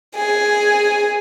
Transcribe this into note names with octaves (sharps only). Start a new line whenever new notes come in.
G#4